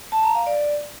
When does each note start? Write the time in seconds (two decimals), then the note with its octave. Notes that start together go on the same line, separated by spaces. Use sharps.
0.12 A5
0.24 A#5
0.35 F5
0.46 D5